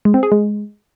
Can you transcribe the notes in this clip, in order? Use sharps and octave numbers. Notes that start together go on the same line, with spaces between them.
G#3
C4
G#4
G#3